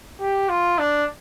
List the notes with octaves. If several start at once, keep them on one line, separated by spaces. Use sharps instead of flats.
G4
F4
D4